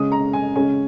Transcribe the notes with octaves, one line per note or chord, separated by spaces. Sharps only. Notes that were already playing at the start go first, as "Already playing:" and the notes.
Already playing: C#3 G#3 C#4 D#6
A#5
G#5
C#3 G#3 C#4 G#5